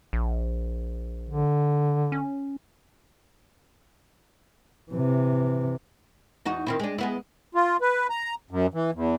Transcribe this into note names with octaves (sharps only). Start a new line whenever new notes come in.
A#1
D3
C#4
C3 E3
E2 D#4 F#4
D#3 C4 E4
G#3 D4
G#3 B3 E4
F4
B4
A#5
F#2
E3
E2